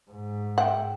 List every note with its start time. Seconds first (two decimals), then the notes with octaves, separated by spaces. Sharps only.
0.11 G#2
0.58 E5 F#5 G5